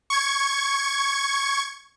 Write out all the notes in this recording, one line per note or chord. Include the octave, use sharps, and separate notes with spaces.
C#6 G#6